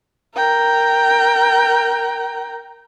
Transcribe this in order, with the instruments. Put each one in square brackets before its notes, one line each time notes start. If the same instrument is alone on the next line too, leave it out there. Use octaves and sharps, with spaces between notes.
[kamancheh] A#4 G5